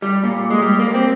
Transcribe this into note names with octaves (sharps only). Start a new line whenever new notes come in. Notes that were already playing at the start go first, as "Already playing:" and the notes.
G3
A#2
G#3
G3
A#3
C4